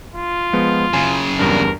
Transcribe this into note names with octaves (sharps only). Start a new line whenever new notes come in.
F4
F3 G#3 B3
F#2 C#3 G#5
E2 G2 D4 A#4